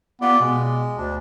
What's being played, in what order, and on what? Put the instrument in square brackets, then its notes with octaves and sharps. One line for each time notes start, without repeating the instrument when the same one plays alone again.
[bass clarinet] B3 [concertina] F4 G4 D5
[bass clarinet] B2 [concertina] G#3
[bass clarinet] D2 [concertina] D4